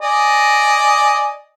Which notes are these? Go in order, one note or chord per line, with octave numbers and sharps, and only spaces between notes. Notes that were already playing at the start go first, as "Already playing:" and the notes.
D5 D#5 G#5